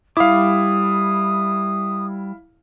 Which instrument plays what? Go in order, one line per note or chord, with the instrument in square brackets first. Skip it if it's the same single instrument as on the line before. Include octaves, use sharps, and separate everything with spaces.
[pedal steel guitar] G3 D6 [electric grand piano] E4 F5 [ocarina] D#6